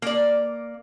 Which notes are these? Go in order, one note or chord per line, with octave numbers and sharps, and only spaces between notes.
A#3 D5